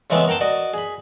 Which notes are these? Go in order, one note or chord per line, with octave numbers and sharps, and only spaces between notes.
C#3 E3 G#3 A3 B3 C4
A#4 F#5 G5 A5 C6
F#4 D5 D#5
G#4 B5